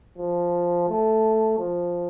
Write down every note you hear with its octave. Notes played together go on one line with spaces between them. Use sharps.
F3
A3
F3